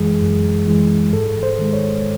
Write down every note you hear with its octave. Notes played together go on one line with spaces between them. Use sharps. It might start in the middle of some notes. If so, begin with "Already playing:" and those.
Already playing: F#2 E3 G#3 G#4
F#2
E3 G#3
G#2 A4
C5
D#3 G#3
C#5